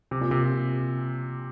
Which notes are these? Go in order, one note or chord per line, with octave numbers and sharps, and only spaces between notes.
C3
A#2
C3